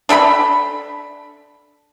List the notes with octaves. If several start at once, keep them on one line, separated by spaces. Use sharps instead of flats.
D4 A4 G5 B5